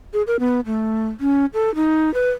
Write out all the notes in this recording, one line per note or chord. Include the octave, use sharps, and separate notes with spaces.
G#4
A#4
B3
A3
C#4
A4
D#4
B4